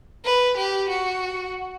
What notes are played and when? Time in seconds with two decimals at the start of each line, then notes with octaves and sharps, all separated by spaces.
0.25 B4
0.57 G4
0.89 F#4